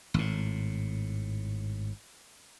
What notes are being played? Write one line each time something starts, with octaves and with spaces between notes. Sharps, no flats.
G#1 A2